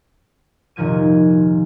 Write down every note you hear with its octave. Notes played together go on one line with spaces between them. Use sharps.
F1 A#2 D#3 F3 G#6 D#7